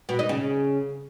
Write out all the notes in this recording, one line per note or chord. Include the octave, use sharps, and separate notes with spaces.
B2
D#4
C#3